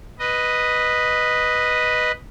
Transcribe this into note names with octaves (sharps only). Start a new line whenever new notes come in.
B4 D#5